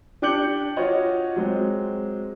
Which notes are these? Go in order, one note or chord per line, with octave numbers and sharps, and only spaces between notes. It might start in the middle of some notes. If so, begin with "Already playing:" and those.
D4 G4 D6 G6 C#7 F#7
F4 F#4 C#5 D#5
F#3 G#3 C4